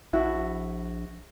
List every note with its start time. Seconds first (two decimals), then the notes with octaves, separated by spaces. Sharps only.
0.13 A#1 E4 F#4